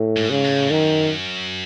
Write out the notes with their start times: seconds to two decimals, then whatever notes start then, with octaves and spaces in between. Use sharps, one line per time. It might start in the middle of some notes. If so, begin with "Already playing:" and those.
Already playing: A2
0.17 G#2
0.30 C#3
0.44 A2
0.71 F#2 D#3